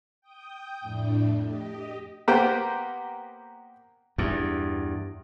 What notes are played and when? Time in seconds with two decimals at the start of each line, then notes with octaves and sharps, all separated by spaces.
0.21 G5 D#6 G6
0.81 F2 A2 A3 D4
1.39 G4 D#5
2.28 A#3 B3 G4 C5 G5
4.18 E2 G2